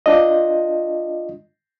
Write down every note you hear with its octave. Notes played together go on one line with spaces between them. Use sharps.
D4 F4 D#5